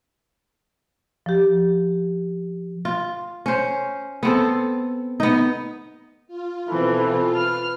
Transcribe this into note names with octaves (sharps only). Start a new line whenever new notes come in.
F3 G4
F4
C#4 C5
B3 C4 A4
B3 D#4
F4
B2 E3 C4 A4
B4 F6